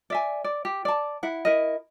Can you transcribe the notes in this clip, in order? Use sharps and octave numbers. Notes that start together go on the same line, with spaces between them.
D5 E5 G#5
D5
G4
D5 A5
E4 F#5
E4 A#4 D#5